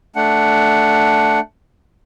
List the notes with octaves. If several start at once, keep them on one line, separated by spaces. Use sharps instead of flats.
A3 D4 F#5